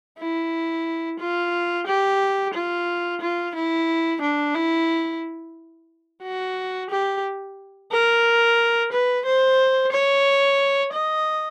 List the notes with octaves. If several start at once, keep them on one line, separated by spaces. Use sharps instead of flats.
E4
F4
G4
F4
F4
E4
D4
E4
F#4
G4
A#4
B4
C5
C#5
D#5